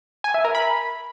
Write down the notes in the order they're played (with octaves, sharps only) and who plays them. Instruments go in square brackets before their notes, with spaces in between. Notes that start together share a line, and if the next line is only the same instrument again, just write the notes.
[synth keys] G#5
E5
A#4
B5